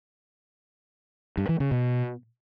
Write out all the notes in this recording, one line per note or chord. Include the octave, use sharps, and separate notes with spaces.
G2
E3
C#3
B2